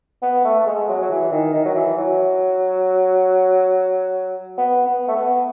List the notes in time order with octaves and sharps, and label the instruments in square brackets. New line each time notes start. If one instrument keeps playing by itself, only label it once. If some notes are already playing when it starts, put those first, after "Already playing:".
[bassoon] B3
A3
A3
G#3
F#3
F#3
E3
D#3
D#3
F#3
E3
F#3
B3
B3
A3
B3